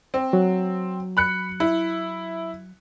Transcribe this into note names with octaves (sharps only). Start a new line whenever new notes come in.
C4
F#3
B5 F#6 C#7
E4